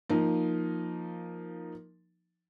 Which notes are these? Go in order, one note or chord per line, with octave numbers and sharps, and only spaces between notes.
F3 A#3 D#4